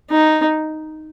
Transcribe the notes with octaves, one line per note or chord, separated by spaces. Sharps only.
D#4